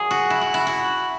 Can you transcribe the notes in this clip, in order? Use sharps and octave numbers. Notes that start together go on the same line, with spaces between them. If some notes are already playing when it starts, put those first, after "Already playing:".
Already playing: D#3 F#3 G#4
F#4
E4
F#4
E4
F#4